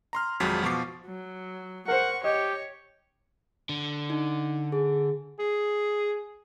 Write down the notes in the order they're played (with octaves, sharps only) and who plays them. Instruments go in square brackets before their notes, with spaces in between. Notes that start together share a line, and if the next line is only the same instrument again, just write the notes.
[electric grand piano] A#5 C6 F6
G#1 F2 F#3 G#3 A6 B6
B2 F3 C#6 D6 C7
[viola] F#3
[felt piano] A#4 C5 [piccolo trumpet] F#5 [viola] C#6
[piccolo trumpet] G4 [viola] C#5 [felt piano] D#5
[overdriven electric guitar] D3
[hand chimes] D#4
G#4
[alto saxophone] G#4